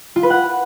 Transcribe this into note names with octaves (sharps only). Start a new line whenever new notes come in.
F4
B4
F#5